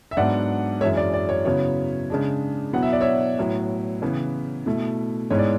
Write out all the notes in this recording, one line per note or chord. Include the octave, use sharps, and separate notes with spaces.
E5
G#2 F#3 B3 D4 D5 F#5
F#2 E3 G#3 C#5 E5
D5
D5
C#5
C#3 F#3 B3 E4 C#5
C#3 G#3 D4
B2 F#3 B3 E4 F#5
E5
D5
C#5 E5
A2 F#3 B3 E4
C#3 E3 B3 E4
B2 A3 E4
G#2 G#3 B3 E4 C#5
D5